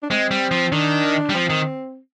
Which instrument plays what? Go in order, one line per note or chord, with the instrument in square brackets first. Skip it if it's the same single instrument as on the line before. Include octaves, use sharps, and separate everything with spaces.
[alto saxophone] D4
[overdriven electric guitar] G#3 [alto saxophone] C4
[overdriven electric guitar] G3
F3
[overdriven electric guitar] D#3 [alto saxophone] D4
[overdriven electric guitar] G3
[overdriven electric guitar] F3 [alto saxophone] C4
[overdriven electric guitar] D#3